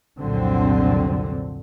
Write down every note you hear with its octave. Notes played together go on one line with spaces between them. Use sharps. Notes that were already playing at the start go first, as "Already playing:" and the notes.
C2 F2 A#2 D3 F#3 C4